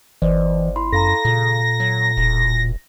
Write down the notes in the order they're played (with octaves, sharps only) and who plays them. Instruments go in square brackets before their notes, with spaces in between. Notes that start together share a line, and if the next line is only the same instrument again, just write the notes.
[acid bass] G1 [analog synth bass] E3 [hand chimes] C5 D5 D#5
[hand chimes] E4 B5 C6
[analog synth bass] F#2 [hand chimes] A4 F5 A#5 [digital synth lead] A#6
[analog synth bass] A#2 [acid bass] C#3
[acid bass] F#3
E1